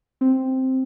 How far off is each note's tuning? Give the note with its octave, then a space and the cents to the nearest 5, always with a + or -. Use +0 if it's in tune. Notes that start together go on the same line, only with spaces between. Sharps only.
C4 +0